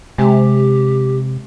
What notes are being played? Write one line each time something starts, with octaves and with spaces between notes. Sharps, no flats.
C3 G#3 G4